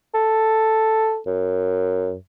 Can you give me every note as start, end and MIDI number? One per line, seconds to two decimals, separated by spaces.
0.14 1.19 69
1.27 2.14 42